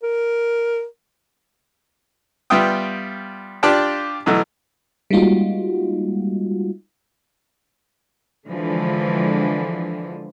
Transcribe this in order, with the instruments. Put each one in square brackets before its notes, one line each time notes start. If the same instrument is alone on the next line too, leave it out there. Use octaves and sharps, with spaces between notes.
[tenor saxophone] A#4
[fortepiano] G3 B3 F4 E5 G5 D#6
D4 F4 G4 D5 G5 A5
B2 E3 F#3 A3
[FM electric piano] G3 G#3 A#3 D#4 F4 F#4
[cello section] D3 E3 F3 G#3